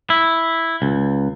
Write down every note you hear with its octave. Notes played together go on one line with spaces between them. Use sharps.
E4
C#2